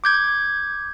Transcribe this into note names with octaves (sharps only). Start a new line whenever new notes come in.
D6 G6 G#6